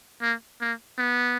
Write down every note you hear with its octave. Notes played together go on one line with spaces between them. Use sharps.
A#3
A#3
B3